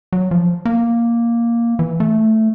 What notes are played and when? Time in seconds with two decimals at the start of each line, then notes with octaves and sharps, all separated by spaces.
0.13 F#3
0.31 F3
0.65 A#3
1.79 E3
2.00 A3